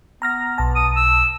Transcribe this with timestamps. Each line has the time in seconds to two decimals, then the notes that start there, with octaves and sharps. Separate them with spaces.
0.22 B3 A#5 F6 A#6
0.58 B1 A5
0.76 D#6
0.96 E6